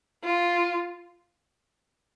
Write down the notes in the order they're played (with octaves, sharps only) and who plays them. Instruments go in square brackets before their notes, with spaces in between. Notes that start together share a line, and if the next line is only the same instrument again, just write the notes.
[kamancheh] F4